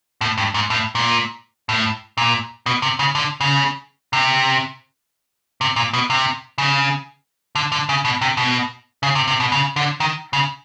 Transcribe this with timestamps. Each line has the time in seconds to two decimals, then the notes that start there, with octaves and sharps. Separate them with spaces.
0.21 A2
0.38 G2
0.54 G#2
0.70 A2
0.95 A#2
1.69 A2
2.18 A#2
2.66 B2
2.82 C3
2.99 C#3
3.15 D3
3.41 C#3
4.13 C3
5.61 C3
5.76 A#2
5.93 B2
6.10 C3
6.58 C#3
7.55 D3
7.72 D3
7.89 C#3
8.05 B2
8.21 C3
8.37 B2
9.03 C#3
9.15 C3
9.28 C3
9.40 B2
9.52 C#3
9.76 D3
10.00 D#3
10.33 C#3